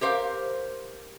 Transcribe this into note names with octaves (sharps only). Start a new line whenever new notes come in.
G4 A#4 C5 E5 F5